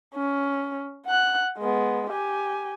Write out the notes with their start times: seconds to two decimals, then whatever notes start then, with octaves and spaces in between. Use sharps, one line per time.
0.15 C#4
1.06 F#5 F#6
1.58 G#3 B3
2.10 G4 G#5